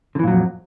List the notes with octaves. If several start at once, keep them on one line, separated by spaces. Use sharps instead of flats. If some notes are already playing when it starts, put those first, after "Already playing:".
F2 A#2 D3 E3 F#3